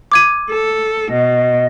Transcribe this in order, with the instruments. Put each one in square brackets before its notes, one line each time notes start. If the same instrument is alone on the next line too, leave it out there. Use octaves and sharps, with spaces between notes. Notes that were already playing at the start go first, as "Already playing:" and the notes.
[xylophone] D6 G#6 D#7
[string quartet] A4
[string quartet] B2 [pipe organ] D#5